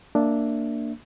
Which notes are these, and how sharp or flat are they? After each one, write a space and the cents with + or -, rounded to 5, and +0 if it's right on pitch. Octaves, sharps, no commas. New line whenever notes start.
A#3 -15 D4 +0 E5 +0